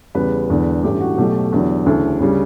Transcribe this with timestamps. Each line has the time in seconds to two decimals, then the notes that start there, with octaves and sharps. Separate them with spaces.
0.15 E2 C#3 G3 B4
0.49 E1 E2 D3
0.83 A1 G2 E3 A3 G4
1.01 F#4
1.18 B1 B2 F#3 A3 G4
1.52 E2 D3 F#3
1.86 D2 C#3 E3 A4
2.20 D2 C#3 G3